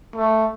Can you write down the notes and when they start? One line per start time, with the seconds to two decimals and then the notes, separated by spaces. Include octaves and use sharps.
0.15 A3